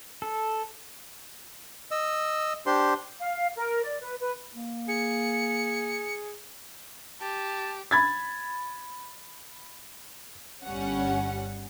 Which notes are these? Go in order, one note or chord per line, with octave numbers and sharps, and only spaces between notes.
A4
D#5 E6
D4 G4 C5 C6
F5
A#4
D5
B4
B4
A#3
G#4 C#7
G4 A5
B5 G#6 A6
G1 G3 C#4 F#5